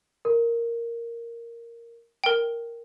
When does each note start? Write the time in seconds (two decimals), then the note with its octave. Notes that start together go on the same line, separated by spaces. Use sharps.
0.25 A#4
2.24 A#4 G5